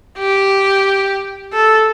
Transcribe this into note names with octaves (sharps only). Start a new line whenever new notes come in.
G4
A4